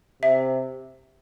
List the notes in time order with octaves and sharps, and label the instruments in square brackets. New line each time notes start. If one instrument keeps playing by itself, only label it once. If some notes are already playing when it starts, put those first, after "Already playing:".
[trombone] C3 [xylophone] E5